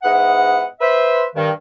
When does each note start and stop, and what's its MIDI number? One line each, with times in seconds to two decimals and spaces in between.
0.03 0.65 44
0.03 0.65 59
0.03 0.65 64
0.03 0.65 75
0.03 0.65 78
0.81 1.25 71
0.81 1.25 72
0.81 1.25 76
1.36 1.51 43
1.36 1.51 51